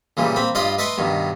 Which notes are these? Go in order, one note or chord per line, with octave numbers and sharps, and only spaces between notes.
A#2 C#3 E3 G3
A#3 C4 B5
G2 F4 D5 D#5 B5 C6
B4 D#5 E5 A5 C6 C#6
G2 B2 D#3